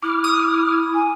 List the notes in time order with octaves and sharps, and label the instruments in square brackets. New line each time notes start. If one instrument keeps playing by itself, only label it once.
[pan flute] E4 [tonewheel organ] D6 F6
[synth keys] D#6
[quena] G#5